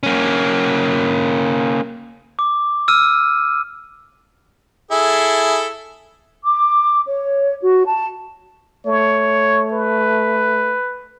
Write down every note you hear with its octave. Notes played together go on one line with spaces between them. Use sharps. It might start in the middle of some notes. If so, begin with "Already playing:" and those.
A#3 C#4
D6
E6 F6 D#7
E4 G#4 A4
D6
C#5
F#4
A5
A3 C#5
B4